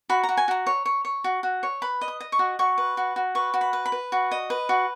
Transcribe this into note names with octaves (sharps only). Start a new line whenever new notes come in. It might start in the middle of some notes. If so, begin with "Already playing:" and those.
F#4 B5
A#5
F#4
G#5
F#4 A#5
C#5
C#5
C#5
F#4
F#4
C#5
B4 B5
D#5
D#6
D#5
C#6
F#4
F#4 C#6
B4
F#4
F#4
B4 C#6
F#4
B5
B4
B5
B4
F#4
D#5
B4
F#4